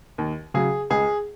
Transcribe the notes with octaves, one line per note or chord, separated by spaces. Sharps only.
D#2
C#3 F#3 G#4
C#2 G#4